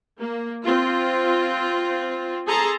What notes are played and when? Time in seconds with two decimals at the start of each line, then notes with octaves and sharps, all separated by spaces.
0.19 A#3
0.64 C4 F4
2.46 G#4 A4 A5 A#5 C6